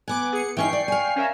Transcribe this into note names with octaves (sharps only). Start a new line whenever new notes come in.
B3 G#5 D6 F#6
G#4 C#7
E3 C#4 D#4 G5 C#6 C7
D5
F5 G#5
C#4 A#4 E5